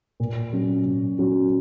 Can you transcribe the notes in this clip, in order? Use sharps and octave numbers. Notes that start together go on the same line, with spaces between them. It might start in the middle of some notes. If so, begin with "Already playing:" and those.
A#2
F#3 C#4 F#4
A#2
F#3 C#4 F#4